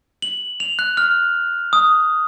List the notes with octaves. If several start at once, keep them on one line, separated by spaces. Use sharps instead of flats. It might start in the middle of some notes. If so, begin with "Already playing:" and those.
F#7
F7
F#6
F6
D#6